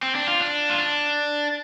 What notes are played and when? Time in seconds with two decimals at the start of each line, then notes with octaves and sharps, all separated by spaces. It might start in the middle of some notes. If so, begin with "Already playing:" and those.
0.03 C4
0.15 D4
0.28 F4
0.41 D4
0.70 F4
0.78 D4